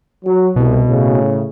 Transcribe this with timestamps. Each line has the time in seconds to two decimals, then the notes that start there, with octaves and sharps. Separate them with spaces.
0.25 F#3
0.56 C2 B2
0.88 A2 C#3